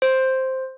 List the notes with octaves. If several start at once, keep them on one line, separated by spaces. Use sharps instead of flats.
C5